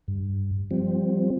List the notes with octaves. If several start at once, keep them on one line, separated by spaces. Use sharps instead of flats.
G2
F3 G3 C4